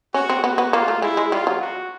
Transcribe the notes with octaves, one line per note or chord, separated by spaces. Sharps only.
C#4 F#4
C4
B3 F#4
B3
A#3 F4
A3
G#3 E4
G#3
G3 F4
F#3
F#4